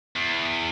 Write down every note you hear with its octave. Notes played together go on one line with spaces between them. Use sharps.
E2